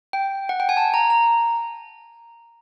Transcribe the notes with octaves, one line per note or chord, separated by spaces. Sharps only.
G5
F#5
G5
G#5
A5
A#5
A#5